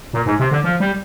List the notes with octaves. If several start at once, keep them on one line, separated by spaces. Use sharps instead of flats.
A#2
G#2
C3
D3
F3
G3